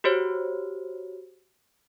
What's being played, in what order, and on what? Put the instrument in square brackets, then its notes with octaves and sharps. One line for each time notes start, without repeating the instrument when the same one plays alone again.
[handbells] F#4 G4 C5 C#5